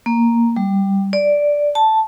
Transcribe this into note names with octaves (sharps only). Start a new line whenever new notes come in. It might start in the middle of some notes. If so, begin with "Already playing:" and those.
A#3
G3
D5
A5